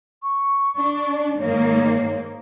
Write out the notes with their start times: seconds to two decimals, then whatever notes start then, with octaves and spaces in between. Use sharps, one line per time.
0.22 C#6
0.77 D4
1.39 G#2 D#3 A#3 C#5